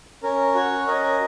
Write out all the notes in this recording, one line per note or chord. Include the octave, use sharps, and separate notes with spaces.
C#4 A#4
F#4 C#5
C#4 A#4 D#5